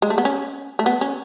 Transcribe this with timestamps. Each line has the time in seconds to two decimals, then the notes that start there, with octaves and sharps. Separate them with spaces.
0.02 G#3
0.10 A3
0.18 B3
0.25 C#4
0.79 A3
0.86 B3
1.01 C#4